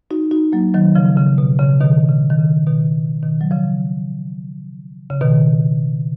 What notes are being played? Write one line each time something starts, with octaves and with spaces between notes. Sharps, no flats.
D#4 F#4
D#4 F#4
F#3 A#3
D#3 F#3
C#3 F3
C#3
B2
C#3
B2 D#3
C#3
D#3
C#3
B2 D#3
B2 D#3
F#3
C#3 F3
C#3
B2 D#3